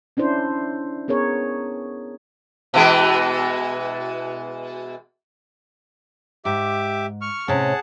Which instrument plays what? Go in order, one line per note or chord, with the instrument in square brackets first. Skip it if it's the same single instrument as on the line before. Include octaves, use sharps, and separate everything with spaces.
[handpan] C#4 D4 E4 C5
B3 G#4 A#4 C#5
[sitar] B2 E3 G#3
[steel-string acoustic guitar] G#2 [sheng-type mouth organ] G4 E5 D6
[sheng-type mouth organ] C#6 F6
[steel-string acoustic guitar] A2 C3 C#4 [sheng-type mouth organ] G#4 F#5 A5